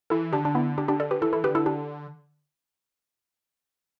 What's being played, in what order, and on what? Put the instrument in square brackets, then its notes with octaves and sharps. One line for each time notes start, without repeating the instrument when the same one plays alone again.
[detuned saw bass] E3 [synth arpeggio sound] E4 A4
[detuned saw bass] D3 [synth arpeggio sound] D4 G4
[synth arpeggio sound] D4
B3 E4
D4 G4
D4 G4
A4 D5
G4 B4
[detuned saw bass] E3 [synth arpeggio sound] E4 A4
[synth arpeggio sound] E4 A4
[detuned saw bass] D3 [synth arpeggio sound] G4 B4
[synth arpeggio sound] E4 A4
D4 G4